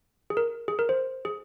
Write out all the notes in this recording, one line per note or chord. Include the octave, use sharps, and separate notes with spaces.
G#4
A#4
G#4
A#4
C5
G#4